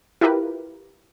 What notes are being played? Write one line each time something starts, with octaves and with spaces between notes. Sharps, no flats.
E4 F4 G4 A#4 B4